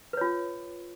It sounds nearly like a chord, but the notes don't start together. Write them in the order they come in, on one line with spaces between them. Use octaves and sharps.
B4 C#5 F4